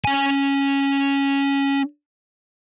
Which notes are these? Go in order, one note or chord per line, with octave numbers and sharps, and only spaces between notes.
C#4 G#5